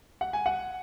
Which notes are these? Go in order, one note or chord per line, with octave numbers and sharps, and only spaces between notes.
F#5
G#5
F#5